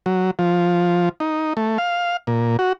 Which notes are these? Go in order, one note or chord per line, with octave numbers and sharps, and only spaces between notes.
F#3
F3
D#4
A3
F5
A#2
F#4